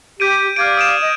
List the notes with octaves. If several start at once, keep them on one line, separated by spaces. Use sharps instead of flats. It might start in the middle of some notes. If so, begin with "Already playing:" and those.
G4 G6 D7 D#7
G4 D5 F5 F6 G#6 D7
D#6 D7 E7
D#5